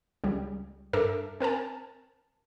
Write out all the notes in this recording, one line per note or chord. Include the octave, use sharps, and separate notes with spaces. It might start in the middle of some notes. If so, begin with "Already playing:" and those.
C#2 G3
G2 A4 A#4 E5 D6
C4 A#4 G#5 A5